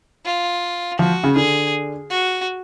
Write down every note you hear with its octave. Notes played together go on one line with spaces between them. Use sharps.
F4
F3 F#4
C#3
D3 G#4
F#4